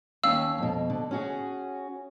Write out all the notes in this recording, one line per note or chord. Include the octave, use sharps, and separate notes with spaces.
D#2 C#4 F5 G5 E6
F2 B2
D3
C#4 F#4 G#4